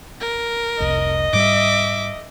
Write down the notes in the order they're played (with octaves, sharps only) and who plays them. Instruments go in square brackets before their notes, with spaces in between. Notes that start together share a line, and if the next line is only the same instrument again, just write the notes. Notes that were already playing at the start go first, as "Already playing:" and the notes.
[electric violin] A#4
[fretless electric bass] F1 C2 [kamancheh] D#5
[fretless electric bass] G#2 G3 [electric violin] E5 D6